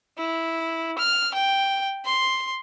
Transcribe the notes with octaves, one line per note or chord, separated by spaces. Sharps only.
E4
F6
G5
C6